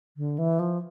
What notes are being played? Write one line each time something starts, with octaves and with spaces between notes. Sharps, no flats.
D3
E3
F3